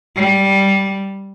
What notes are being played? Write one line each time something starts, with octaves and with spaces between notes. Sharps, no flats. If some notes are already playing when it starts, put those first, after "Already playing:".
G3